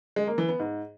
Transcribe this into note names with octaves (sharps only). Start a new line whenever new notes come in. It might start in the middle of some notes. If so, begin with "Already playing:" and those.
G#3
A#3
E3
B3
G#2